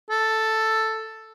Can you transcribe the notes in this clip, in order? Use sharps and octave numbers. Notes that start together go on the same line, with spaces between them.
A4